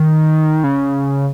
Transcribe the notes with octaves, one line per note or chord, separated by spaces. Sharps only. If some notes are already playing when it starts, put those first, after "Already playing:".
Already playing: D#3
C#3